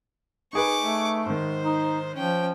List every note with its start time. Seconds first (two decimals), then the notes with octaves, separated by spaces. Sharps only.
0.53 D#4 G#4 B4 C#6 D6
0.82 A3
1.25 G#2 D#3 C5
1.64 D#4
2.15 F3 C#4 G5